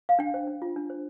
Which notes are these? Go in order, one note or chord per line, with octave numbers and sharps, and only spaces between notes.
F5
D4 G5
C5
D4
F4
D4
C5